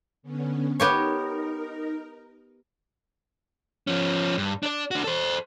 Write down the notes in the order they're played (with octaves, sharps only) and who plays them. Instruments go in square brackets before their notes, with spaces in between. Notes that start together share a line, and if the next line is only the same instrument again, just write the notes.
[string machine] D3 B3 C#4
[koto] B3 G4 C#5 [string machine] D#4 A#4
[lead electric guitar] F3 C#4
G2
D4 D5
D4 F#4
A4 C5